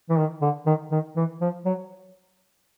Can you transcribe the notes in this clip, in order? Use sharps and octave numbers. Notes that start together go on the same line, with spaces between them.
E3
D#3
D3
D#3
D#3
E3
F3
F#3